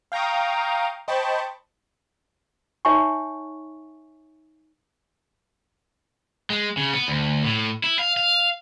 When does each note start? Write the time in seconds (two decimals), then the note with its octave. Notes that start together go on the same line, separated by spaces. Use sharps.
0.12 F5 G5 A#5 C#6 D#6
1.08 C5 D#5 G5 A5 B5 C#6
2.85 D#4 C#5 E5 F#5 G#5 C#6
6.50 G#3
6.77 C#3
6.93 B3
7.08 D2
7.44 A2
7.84 E4
7.99 F5
8.17 F5